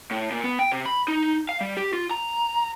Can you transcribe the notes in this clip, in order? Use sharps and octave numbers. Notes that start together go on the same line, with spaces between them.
A2
A#2
B3
G5
C3
B5
D#4
F5
G3
G4
F4
A#5